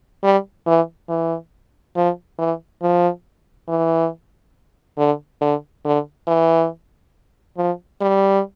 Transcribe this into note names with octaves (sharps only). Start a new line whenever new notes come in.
G3
E3
E3
F3
E3
F3
E3
D3
D3
D3
E3
F3
G3